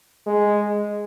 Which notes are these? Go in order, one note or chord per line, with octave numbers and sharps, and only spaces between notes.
G#3